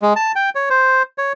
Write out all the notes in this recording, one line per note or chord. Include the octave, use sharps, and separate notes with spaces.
G#3
A5
G5
C#5
C5
C#5